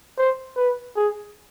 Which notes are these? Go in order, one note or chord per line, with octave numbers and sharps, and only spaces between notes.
C5
B4
G#4